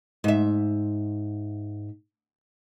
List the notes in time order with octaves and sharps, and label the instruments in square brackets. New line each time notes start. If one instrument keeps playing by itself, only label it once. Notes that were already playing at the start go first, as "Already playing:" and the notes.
[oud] G#2 E5